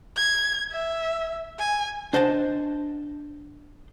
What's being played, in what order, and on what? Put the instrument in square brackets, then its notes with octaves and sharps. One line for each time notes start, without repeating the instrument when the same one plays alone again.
[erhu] G#6
E5
G#5
[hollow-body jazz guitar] D4 C5 D#5 F#5 A5